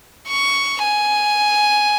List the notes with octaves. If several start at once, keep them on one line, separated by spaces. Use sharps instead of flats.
C#6
G#5